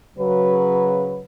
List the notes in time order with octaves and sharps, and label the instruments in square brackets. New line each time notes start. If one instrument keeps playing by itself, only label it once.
[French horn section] C#3 F#3 B4